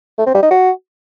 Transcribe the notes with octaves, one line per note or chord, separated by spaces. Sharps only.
A3
C4
G3
D#4
F#4